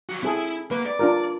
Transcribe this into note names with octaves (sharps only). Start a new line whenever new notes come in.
F3 F#4
C4 E4 G#4 A4
A#3 B4
D5
D4 F4 A#4